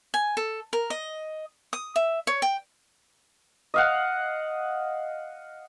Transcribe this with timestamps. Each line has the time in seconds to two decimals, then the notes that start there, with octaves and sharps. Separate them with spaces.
0.14 G#5
0.37 A4
0.73 A#4
0.90 D#5
1.73 D#6
1.96 E5
2.27 C#5
2.42 G5
3.74 D#5 F5 F#5